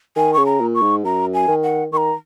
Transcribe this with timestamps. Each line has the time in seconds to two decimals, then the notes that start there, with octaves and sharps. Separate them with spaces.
0.16 D#3 G#5
0.34 C#3 C#6
0.46 A#5
0.61 A#2
0.75 C#6
0.82 G#2
1.04 F#2 A#5
1.34 G#5
1.48 D#3
1.63 F#5
1.92 D#3 A#5 C#6